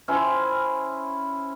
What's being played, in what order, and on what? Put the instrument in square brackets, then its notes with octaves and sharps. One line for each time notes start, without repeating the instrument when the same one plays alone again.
[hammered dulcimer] C#4 E4 C5 G5